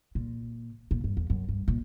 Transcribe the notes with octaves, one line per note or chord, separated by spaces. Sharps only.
A#2
A#2
G2
E2
F#2
G2
A#2